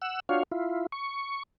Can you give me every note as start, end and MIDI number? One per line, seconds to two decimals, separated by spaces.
0.02 0.20 78
0.02 0.20 88
0.29 0.43 62
0.29 0.43 65
0.29 0.43 66
0.29 0.43 73
0.29 0.43 77
0.51 0.86 64
0.51 0.86 65
0.92 1.43 85